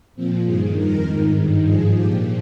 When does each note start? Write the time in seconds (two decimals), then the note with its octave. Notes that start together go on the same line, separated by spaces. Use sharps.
0.15 A#2 F3 C4
0.45 G2 G#4
0.49 D#3
0.75 F2 D#3 A#4
1.04 G#2 D#3
1.34 G2 D#3
1.64 G#2 F3 G#4
1.94 A#2 F3 G4